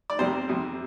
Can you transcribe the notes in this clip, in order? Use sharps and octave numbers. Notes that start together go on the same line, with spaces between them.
D5
F2 C3 G3 C5
F2 C3 G3